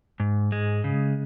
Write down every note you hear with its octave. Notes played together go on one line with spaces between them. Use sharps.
G#2
G#3
C#3